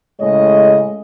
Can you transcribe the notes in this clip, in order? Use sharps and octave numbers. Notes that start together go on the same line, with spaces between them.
A2 C#3 G#3 C#5 D#5